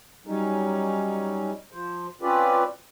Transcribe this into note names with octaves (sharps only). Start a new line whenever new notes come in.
F#3 G3 C#4 D#4
F3 C5
C4 C#4 F4 B4 D5